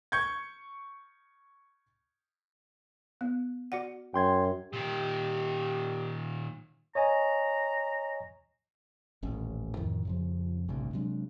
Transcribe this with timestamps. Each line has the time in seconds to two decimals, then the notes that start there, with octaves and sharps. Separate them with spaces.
0.12 C#6 G6 G#6
3.21 B3
3.72 F#4 D5 F#5
4.14 F#2 G5 C6 G#6
4.73 A#2 D#3 G4
6.95 C#5 D#5 G#5 A#5
9.23 D#1 A1 C#4
9.77 F2 A2 D#3 E3
10.05 F2 C#3 F3
10.68 A1 D2 G2 C3
10.93 C3 F#3 G#3 D4